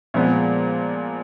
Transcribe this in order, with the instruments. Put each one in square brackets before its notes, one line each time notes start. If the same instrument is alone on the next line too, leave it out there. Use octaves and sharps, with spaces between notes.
[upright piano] A#2 F3 G#3 B3